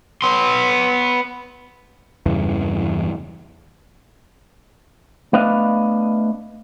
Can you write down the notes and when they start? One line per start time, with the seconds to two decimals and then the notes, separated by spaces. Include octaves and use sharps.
0.22 B3 C6
2.26 E2 G2 C#3 E3
5.33 A3 B3 D4 B4 D#5 F5